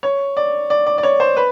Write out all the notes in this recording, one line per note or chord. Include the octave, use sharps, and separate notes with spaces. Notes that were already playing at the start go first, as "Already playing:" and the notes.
C#5
D5
D5
D5
D5
C#5
C5
B4